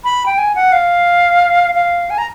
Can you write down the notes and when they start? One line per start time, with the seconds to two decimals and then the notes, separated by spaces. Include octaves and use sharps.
0.04 B5
0.26 G5
0.38 G#5
0.55 F#5
0.72 F5
1.75 F5
2.10 G#5
2.18 A#5